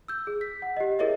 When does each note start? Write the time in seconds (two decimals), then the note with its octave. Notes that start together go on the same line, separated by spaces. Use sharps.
0.08 E6 G6
0.27 G#4
0.41 B6
0.62 F#5
0.77 G4 D#5
0.99 E4 G#4 A#4 C#5 D#5 E5